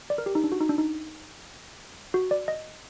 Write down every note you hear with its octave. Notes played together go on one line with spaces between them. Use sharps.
D5
A#4
G4
D#4
D4
F#4
D#4
D4
D#4
F#4
D5
D#5